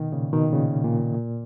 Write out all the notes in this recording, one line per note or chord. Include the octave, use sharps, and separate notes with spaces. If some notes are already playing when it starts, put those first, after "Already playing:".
Already playing: B2 D#3
A#2 C#3
B2 D#3
A#2 C#3
A#2
A#2